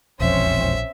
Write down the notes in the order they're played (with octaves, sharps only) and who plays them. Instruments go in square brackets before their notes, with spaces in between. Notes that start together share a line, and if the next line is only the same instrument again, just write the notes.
[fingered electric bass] E1 F2 [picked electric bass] A#1 F3 [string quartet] C4 C#4 C5 [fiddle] E5